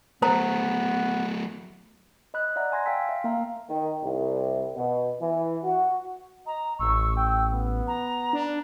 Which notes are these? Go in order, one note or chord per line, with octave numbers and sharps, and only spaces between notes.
F#3 A3 B3 C5 A#5
D#5 B5 F#6
D5 E5 F#5 A#5
G#5 C6 G#6 A#6
F5 G5 A5 E6 B6
E5
A#3 E5 F5 A#5
D#3
C2
B2
E3
F#4
D#5 A#5
A1 C#6 E6
G5
B3
A#5
D4